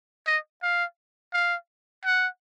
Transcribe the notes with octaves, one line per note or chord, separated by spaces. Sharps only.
D#5
F5
F5
F#5